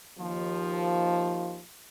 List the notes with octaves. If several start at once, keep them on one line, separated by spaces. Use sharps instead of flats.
D#2 F3